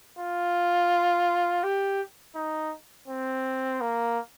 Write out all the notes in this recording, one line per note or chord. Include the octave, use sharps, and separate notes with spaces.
F4
G4
D#4
C4
A#3